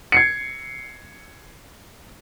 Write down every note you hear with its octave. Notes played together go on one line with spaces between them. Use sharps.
G#6 C7 C#7